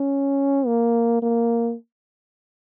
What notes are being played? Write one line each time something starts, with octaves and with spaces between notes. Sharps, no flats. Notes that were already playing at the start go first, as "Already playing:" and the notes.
Already playing: C#4
A#3
A#3